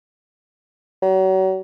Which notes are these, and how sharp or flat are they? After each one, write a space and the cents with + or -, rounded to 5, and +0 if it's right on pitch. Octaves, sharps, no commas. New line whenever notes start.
F#3 +35